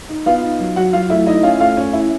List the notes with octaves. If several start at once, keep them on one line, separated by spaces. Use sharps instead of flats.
D#4
B3 F4 F5
D#4
F#3
F#3 F#4 F#5
F#3 F4 F5
A3 E4 E5
D#4 E4 D#5
C#4 F4 F5
A3 F4 F5
C#4 C#5
E4